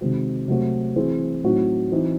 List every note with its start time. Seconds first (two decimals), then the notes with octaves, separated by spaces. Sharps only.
0.01 C3 D#3 G#3 C4 F#4
0.48 C3 F#3 A3 C4 F#4
0.96 E3 C4 E4 G#4
1.44 A2 F#3 C4 D#4 F#4
1.92 E3 C4 D#4